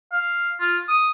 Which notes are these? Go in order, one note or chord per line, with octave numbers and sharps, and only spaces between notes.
F5
F4
D#6